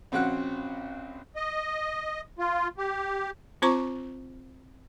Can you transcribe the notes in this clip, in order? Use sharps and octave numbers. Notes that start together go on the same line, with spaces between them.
A#1 C4 C#4 F#4 F#5 F#6
D#5
F4
G4
C4 F4 C5 A#5 C#6 D6